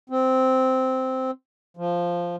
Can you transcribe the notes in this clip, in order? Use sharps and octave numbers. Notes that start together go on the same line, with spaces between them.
C4
F3